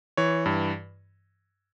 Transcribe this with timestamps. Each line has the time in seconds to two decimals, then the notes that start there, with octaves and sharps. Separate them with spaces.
0.17 E3 C#5
0.46 G2